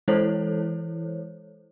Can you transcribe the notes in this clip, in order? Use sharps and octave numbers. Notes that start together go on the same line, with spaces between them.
E3 G#3 E4 A4 C5 C#5